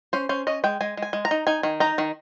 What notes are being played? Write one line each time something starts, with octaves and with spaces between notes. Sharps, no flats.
C#4 C5
C#4 C5
C#4 D#5
G#3 G5
G#3 G#5
G#3
G#5
G#3
A#5
D#4
D#4 G#5
D#3
D#4 A#5
D#3